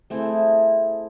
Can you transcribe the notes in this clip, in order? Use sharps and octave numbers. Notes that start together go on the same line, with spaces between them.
A3 C4 E4 G#4